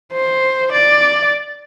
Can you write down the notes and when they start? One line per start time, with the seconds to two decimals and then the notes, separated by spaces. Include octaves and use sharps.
0.13 C5
0.73 D5